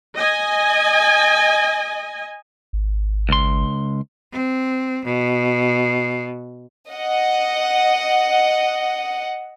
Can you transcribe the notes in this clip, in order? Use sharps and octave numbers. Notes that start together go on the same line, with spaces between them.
D#5 G#5
G#1
C#2 C6
C4
B2
D#5 F#5